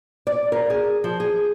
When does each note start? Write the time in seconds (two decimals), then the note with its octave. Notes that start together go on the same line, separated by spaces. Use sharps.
0.27 D5
0.52 A#4
0.70 G#4
1.04 F3
1.20 G#4